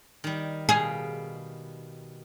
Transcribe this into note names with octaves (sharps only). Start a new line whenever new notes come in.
D#3 G3
B2 G#4 F5 G5